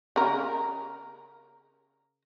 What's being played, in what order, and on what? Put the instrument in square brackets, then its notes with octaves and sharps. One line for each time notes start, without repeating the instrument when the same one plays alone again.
[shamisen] C#3 A#4